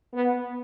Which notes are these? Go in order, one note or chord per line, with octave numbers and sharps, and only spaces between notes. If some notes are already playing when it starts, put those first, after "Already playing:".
B3